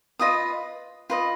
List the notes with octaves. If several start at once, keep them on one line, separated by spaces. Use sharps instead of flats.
F4 B4 D#5 D#6
F4 B4 D#5